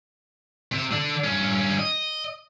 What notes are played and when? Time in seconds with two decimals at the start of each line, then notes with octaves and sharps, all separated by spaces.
0.72 C3 C5
0.92 D3 D4
1.24 G2 C#4
1.79 D#5